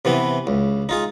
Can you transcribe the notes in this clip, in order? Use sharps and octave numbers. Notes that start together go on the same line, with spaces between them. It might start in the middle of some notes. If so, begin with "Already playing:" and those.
C3 E3 B3
C#2
D#4 F4 G#4